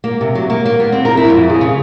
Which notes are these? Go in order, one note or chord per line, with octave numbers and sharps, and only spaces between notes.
A#3
C3
F#3
A#3
A#3
B3
C4
A#4
E4
F2
G#4
C#3